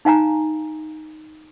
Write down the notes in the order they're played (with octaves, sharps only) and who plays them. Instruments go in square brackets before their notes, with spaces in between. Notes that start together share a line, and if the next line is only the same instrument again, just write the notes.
[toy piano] D#4 F5 G#5 A#5